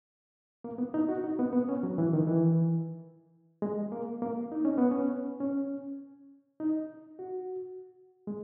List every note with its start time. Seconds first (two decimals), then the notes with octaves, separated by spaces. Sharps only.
0.64 A#3
0.78 B3
0.94 D#4
1.09 F#4
1.24 D#4
1.39 B3
1.53 B3
1.69 C#4
1.83 F#3
1.98 E3
2.13 D#3
2.27 E3
3.62 G#3
3.92 A#3
4.22 A#3
4.52 D#4
4.65 C#4
4.78 B3
4.91 C#4
5.40 C#4
6.60 D#4
7.19 F#4
8.27 G#3